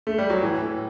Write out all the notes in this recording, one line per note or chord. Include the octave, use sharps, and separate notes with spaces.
A3
G3
F#3
A2 E3
A2